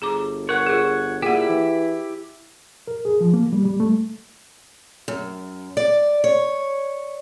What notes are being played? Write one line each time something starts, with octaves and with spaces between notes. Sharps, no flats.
G1 G#4 A#5 D6
A#4 C#5 F#5 C#6
F4 G#4
A#2 E4 G4 G#4 F#5
E3
A#4
G#4
F3
A#3
G3
G3
A3
F#2
D5
C#5